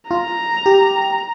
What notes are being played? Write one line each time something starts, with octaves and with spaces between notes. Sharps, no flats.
F4 A#5
G4